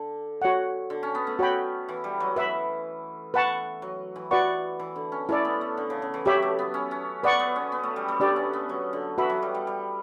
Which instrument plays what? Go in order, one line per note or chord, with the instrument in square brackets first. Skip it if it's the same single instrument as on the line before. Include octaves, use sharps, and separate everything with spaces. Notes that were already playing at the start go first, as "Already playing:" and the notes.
Already playing: [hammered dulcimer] D3
[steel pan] F#4 C#5 F#5
[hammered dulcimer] D3
C#4
B3
A3
[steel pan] F#4 C#5 G5 B5
[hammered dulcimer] E3
G3
F#3
[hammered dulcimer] E3 [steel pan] B4 E5 B5
[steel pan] B4 F#5 A5 C#6
[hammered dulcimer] F#3
E3
[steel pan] F#4 B4 D5 F#5 C#6
[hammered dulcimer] E3
D3
C#4
[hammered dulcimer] C#4 [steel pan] E4 A4 D5
[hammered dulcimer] B3
A3
D3
C#3
C#3
E3
[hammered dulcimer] F#3 [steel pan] G4 C#5 E5 B5
[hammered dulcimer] A3
B3
C#4
C#4
[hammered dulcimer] B3 [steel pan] B4 D5 F#5 C#6
[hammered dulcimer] B3
C#4
B3
A3
G3
A3
[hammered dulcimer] B3 [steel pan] D4 G4 D5
[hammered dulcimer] C#4
B3
F#3
D3
[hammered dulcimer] E3 [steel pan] F#4 B4 E5 B5
[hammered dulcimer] F#3
G3
G3
G3